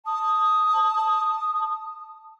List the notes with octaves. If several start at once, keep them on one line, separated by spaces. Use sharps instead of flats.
A5 D#6